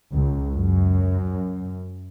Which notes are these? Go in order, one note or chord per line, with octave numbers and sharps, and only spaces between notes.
C#2
F#2